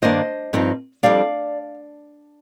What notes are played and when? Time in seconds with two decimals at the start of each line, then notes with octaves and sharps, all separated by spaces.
0.02 G2 D#3 A#3 D4 C5 D#5
0.53 G2 F3 C4 D#4
1.03 F2 C3 G3 D4 D5 F5